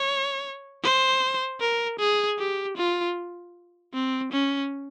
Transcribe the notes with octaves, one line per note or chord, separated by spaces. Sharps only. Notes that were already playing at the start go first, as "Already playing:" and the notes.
Already playing: C#5
C5
A#4
G#4
G4
F4
C4
C#4